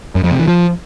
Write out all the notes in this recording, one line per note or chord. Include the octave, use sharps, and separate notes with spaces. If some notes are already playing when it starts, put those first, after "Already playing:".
F#2
F2
C3
E3
F3